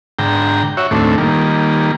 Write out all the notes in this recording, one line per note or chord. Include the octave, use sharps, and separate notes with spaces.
G#2 D3 G5 A#5
F#4 C#5 E5
D#2 A2 A3 C4 D4
D#3 G3 A#3